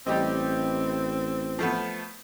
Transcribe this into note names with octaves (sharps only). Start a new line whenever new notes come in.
A1 G3 C4 G4 D#5
F3 A3 B3